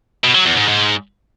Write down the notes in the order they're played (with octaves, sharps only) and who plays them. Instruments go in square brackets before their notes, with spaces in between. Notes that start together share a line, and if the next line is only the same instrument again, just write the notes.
[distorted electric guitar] B2
F#3
E2
G#2
G#2